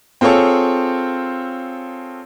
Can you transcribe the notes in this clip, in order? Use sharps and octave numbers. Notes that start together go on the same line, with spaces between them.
C4 F4 G#4 A4 C#5